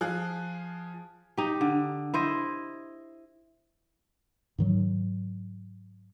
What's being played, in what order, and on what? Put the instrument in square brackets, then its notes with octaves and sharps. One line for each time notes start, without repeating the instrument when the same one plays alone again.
[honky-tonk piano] F3 G#4 F5 F#6
[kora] D#4 G4
D3
E4 C5 D#5
[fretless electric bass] G#2 D#3 F#3